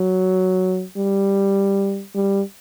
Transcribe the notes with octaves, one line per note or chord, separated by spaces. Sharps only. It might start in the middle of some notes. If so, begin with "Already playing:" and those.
Already playing: F#3
G3
G3